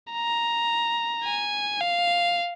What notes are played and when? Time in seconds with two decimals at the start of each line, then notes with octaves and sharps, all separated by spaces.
0.12 A#5
1.24 G#5
1.81 F5